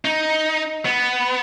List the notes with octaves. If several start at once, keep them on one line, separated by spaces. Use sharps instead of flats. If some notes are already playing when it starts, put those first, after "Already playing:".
D#4
B3